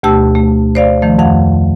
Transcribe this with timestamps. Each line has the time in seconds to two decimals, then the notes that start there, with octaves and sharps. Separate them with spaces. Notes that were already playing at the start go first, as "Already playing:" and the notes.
0.03 D2 B2 A3 G4 A5 E6
0.35 A3
0.75 C5 D5 F5
1.02 D#3 F3 A3
1.19 F2 F5 F#5